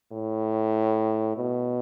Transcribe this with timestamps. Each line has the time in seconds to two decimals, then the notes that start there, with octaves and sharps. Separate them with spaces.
0.12 A2
1.36 B2